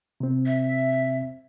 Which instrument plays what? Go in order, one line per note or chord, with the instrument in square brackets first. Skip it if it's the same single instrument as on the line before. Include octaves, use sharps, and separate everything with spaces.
[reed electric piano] C3 C4
[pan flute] E5